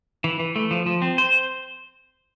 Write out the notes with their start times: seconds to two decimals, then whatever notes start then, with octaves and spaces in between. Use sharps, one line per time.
0.24 E3
0.39 E3
0.56 A3
0.71 F3
0.86 F3
1.02 C4
1.18 C5